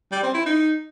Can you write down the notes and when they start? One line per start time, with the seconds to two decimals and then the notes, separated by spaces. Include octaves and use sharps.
0.11 G3
0.23 C4
0.34 E4
0.45 D#4